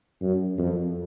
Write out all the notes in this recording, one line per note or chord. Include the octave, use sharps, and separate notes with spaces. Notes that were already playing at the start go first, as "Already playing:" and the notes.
F#2
F2